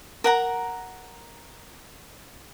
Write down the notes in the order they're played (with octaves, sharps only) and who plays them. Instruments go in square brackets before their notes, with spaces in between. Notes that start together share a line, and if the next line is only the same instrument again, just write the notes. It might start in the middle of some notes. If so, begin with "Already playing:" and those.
[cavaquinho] A#4 F#5 A#5